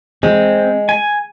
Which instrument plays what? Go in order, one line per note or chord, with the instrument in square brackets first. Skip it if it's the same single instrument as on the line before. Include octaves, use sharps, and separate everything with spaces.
[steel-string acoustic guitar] G#3 [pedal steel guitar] C4
[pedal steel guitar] G#5